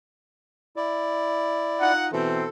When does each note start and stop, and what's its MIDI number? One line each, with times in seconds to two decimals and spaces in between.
0.76 1.93 64
0.76 1.93 74
1.80 2.07 63
1.80 2.07 65
1.80 2.07 78
2.12 2.45 47
2.12 2.45 52
2.12 2.45 60
2.12 2.49 69